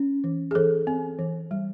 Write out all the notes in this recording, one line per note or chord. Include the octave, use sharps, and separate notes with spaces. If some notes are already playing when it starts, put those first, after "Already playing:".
Already playing: C#4
E3
G#4
E3 A4
C4
E3
G3